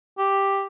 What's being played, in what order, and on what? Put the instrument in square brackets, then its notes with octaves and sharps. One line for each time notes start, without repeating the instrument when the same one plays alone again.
[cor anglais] G4